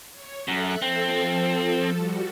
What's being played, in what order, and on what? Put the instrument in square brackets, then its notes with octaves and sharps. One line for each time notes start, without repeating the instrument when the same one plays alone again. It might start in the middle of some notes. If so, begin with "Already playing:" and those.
[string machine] C#5
[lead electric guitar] F#2 [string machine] A4 E5 F#6
[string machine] F3 A4 [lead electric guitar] C4
[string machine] G3 F#4